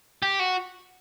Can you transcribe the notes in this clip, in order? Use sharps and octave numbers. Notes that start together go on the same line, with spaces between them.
G4
F#4